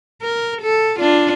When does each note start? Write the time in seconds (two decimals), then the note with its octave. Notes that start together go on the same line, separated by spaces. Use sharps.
0.22 A#4
0.62 A4
0.99 D4 F4